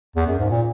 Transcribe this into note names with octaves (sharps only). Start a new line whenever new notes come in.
E2
F#2
G#2
A#2